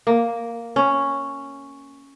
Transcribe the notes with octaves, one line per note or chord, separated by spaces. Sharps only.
A#3
C#4